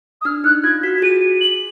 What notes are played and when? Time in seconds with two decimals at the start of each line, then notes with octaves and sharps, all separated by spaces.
0.21 D#6
0.25 D4 F6
0.44 D#4 F#6
0.63 F4 G#6
0.83 F#4 B6
0.98 F#4
1.02 G#4 D#7
1.41 F#7